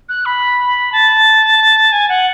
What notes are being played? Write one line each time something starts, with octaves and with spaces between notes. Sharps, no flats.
F#6
B5
A5
G#5
F#5